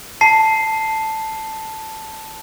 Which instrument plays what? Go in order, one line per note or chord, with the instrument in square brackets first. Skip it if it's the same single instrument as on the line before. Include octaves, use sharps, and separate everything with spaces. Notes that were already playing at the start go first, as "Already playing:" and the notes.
[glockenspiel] A5 C7